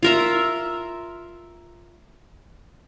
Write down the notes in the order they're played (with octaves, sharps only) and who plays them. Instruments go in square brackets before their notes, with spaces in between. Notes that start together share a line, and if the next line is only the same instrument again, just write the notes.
[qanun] F4 A#4 E5